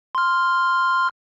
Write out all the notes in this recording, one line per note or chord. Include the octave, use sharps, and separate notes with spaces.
C6 F6